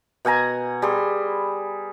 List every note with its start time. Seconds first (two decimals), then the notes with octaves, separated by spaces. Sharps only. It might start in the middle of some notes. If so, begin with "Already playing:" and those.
0.25 B2 F#5 G#5 A#5
0.82 G3 G#4 C6